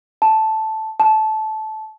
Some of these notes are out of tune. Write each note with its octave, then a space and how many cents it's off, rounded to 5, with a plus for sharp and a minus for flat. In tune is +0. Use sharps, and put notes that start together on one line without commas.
A5 -5
A5 -15